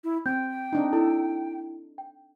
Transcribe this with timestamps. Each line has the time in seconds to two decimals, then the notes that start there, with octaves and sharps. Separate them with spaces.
0.04 E4
0.26 C4 G5 G6
0.73 C4 D4 D#4
0.93 E4 A4
1.98 G5